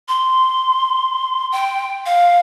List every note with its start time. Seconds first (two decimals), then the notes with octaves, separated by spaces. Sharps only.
0.08 C6
1.52 G5
2.06 F5